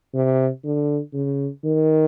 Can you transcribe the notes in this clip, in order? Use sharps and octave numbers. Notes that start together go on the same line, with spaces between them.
C3
D3
C#3
D#3